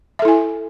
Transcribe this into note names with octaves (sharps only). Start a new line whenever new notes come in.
E4 A4 E5 G#5